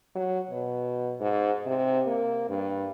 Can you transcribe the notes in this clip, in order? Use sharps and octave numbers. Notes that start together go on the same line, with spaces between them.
F#3
B2
G#2
C3
A#3
G2